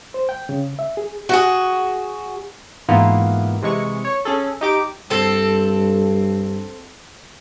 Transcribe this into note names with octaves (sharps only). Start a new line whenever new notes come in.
C5
G5
C#3
E5
G#4
F#4 G#4
G#2 E3 A#3 B3 F4
C3 E3 G#3 C#6
C#5
C#4 G#4 A4
D#4 G4 D6
G2 C4 A4